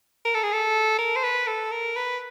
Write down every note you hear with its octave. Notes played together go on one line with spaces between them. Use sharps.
A#4
A4
G#4
A4
A#4
C5
B4
A4
A#4
B4